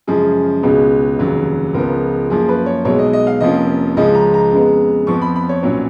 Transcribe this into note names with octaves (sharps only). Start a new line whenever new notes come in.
F#2 C#3 F3 G#3 G#4
C#2 B2 G#3 C#4
F1 D#2 C#3 F#3
C#2 C#3 F3 B3 A#4
F#2 F3 A#3 G#4
B4
C#5
B1 B2 G#3 C#5
D#5
D#5
F5
F1 F2 F3 A#3 C#4 D#5
C#2 C#3 F3 G#3 C#4 D#5
A#5
A#5
F2 C#3 G#3 B3
F2 F3 B3 C#6
B5
B5
C#5
B1 A#2 F#3 C#4 C#5